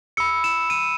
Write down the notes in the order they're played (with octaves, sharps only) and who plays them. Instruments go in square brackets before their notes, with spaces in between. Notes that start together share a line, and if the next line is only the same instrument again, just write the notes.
[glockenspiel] B5 E6 C#7
E7
D#7